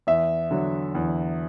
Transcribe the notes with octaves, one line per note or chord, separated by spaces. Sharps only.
E2 E5
D3 F#3
E2